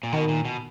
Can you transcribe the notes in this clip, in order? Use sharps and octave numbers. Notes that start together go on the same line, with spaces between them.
A#2
B2 D#3
A#2
B2